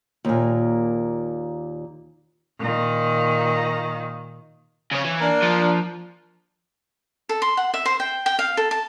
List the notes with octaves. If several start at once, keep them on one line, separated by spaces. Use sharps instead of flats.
D#2 A#2
A#2 D#3
C#3 C#5
E3
A#3 D4
F3
A4
C6
F#5
E5
C5
G5
G5
F5
A4
A5